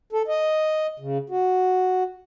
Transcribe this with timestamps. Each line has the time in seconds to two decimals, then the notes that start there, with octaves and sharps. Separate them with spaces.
0.13 A4
0.28 D#5
1.00 C#3
1.30 F#4